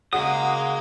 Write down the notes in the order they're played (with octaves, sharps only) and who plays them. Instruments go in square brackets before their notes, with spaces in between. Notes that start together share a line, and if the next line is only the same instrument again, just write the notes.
[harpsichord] C#3 [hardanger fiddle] G#3 A#3 [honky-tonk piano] F#4 [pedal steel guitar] D#6